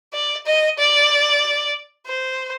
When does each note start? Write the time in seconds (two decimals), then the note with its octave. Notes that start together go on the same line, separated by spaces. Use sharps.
0.14 D5
0.46 D#5
0.78 D5
2.06 C5